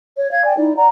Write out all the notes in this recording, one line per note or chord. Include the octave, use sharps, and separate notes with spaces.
C#5
F5 G#6
D5 G5 G#5
D#4 E4 D5
D5 F#5 A#5